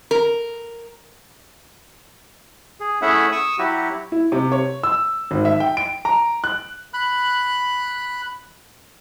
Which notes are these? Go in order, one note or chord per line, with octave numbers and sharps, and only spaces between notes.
A#4
G#4
A3 C#4 E4 G#4 E5 F#5
C#6 D#6 E6
F#3 E4 F#4 G4
E4
C3
C#5
E6
G#1
E5
G5
D7
A#5
F#6
B5 F#6